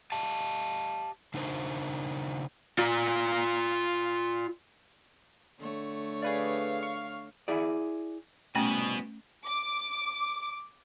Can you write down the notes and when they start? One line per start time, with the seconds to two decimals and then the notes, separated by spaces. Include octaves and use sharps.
0.12 G4 D#5 F5 A5
1.34 C#3 D4 D#4 A#4 C5
2.79 F4 D5
5.59 D3 A3 C#5
6.22 G#4 B4 D5 F5
6.83 C#6
7.48 E4 G#4 D5
8.55 C2 B2 A3 B3 C#4 F#4 G#5
9.45 D6